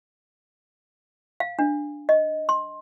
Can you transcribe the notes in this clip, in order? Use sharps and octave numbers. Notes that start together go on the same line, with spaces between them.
F5
D4
D#5
C6